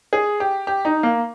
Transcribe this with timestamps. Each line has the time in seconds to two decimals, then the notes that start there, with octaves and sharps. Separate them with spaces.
0.13 G#4
0.40 G4
0.67 G4
0.85 D#4
1.03 A#3